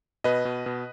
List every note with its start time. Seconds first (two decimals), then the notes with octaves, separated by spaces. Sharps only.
0.24 B2 B4 D#5
0.45 B2
0.66 B2